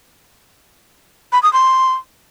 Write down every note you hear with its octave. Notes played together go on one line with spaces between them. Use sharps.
B5
D#6
C6